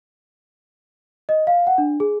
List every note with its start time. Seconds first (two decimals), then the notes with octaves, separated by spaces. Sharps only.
1.29 D#5
1.47 F5
1.67 F#5
1.78 D4
2.00 G#4